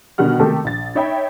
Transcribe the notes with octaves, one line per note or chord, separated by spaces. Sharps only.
B2 D3 D#3 G3 F#5 F6
C3 D#3 A3 D#4 G4 A4
A#1 A6
D#4 C#5 E5 G5 B5